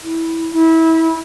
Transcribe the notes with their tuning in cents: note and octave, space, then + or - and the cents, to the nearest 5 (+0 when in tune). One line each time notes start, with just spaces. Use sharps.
E4 -5
E4 -25